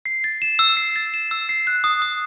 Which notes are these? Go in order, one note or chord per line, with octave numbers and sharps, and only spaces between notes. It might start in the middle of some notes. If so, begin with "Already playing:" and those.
C7
A6
E7
E6
C7
A6
E7
E6
C7
F#6
D#6
D#6